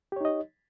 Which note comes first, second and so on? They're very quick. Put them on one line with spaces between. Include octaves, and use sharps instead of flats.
G4 C#5 D#4 D#5